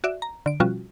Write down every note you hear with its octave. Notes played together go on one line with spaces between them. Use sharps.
F#4 D5 E5
A#5
D3 D7
B2 F3 G3 C#4 F4 F#4